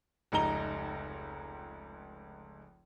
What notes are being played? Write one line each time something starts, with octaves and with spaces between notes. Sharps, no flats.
F1 C#2 D#4 A#5 G7